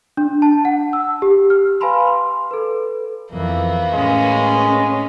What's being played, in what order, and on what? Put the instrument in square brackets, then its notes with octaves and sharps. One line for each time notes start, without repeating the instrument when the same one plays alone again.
[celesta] D4
A5
F#5
E6
G4
F6
B4 F5 G#5 A5 B5 C6
C6
A4 B4
[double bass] F2 E3 [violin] A#3 B3
[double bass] A2 [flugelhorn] G#3 [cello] C#4